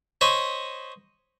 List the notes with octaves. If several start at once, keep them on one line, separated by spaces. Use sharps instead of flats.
C5 C#5 D#5 B5 C#6 D#6